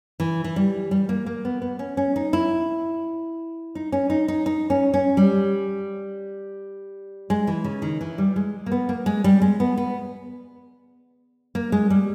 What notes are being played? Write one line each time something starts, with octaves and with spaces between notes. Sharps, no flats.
E3
E3
G3
G3
A#3
A#3
B3
B3
C#4
C#4
D#4
E4
D#4
C#4
D#4
D#4
D#4
C#4
C#4
G3
G#3
E3
C#3
D#3
E3
G3
G#3
A#3
B3
A#3
G#3
G3
G#3
B3
B3
A#3
G#3
G3